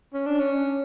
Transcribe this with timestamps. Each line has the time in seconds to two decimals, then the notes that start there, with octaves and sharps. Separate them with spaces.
0.13 C#4
0.26 D4
0.40 C#4